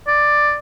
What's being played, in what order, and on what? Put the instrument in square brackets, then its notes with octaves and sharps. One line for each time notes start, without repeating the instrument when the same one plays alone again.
[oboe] D5